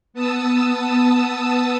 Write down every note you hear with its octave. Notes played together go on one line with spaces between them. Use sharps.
B3 A5 D#6 E6